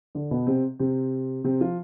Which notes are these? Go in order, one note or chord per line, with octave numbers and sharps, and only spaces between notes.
D3 D4
B2 B3
C3 C4
C3 C4
C3 C4
F3 F4